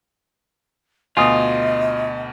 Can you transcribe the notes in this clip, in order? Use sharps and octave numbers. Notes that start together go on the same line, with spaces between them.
D2 B2 F4 D#5 G#5 C6 D#6